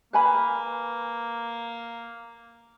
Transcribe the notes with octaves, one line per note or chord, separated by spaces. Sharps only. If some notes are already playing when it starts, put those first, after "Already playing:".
A#3 B4 G#5 B5